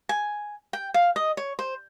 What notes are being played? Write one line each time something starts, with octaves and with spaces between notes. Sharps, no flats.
G#5
G5
F5
D#5
C#5
C5